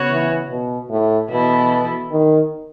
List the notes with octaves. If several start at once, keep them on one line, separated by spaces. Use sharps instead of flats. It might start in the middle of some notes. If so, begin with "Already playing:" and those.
Already playing: C#3 B3 F#4 C#5
E3
B2
A2
B2 E3 B3 E4 A4
D#3